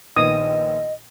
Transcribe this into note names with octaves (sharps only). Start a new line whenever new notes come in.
A#1 D#3 B3 D#5 D#6